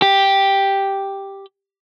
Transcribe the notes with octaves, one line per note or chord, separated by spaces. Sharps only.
G4